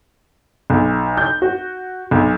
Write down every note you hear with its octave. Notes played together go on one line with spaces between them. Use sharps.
B1
G6
F#4
B1